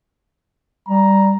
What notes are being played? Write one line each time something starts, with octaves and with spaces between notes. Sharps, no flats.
G3 A#5